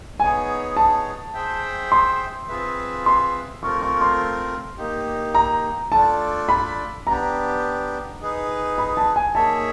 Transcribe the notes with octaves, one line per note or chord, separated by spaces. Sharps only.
B3 D#4 G#4 C#5 G#5
A5
G#4 C5 E5 G5
C6
C4 F4 G#4 B4 E5
C6
A3 C4 F4 A#4 C#6
C#6
C6
A#3 D#4 G4
A#5
A3 D4 F4 A4 D5 A5
B5
B3 D4 G4 A#5
D#4 G#4 B4
B5
A5
G#5
A#3 D#4 G#4 C#5 E5 A5